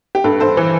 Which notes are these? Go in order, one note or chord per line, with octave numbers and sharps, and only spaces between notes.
G4
G2 A4
G2 A4 C5
E3